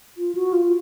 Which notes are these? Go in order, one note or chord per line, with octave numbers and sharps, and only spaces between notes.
F4
F#4
F4